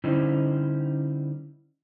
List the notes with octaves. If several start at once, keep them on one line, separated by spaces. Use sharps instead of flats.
D3 G3 C#4 D#4 E4 C5